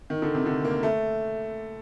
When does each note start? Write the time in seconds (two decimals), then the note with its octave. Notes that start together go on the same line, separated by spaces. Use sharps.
0.10 D#3
0.22 D3
0.34 C3
0.46 D3
0.65 A#3
0.83 A3